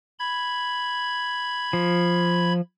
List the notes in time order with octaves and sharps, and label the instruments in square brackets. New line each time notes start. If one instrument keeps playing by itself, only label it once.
[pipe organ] B5 G#6
[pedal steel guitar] F3